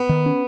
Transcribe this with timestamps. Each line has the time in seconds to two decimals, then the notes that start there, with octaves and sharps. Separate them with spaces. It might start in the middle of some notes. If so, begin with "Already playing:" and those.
Already playing: B3
0.09 D#3
0.26 C#4